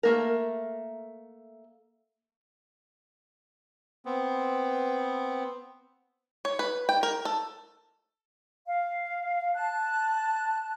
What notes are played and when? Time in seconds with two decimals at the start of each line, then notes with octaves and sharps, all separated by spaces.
0.03 A3 A#3 A#4
4.05 B3 C4
6.45 C#5
6.59 B4
6.89 G5
7.03 A#4
7.25 A4
8.67 F5
9.54 A5 F#6